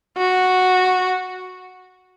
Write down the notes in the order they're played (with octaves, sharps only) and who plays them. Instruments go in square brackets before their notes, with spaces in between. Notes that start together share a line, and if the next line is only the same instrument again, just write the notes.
[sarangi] F#4